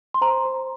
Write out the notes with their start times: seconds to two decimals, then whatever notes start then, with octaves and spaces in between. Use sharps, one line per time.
0.14 C6
0.21 C5 A#5
0.45 C5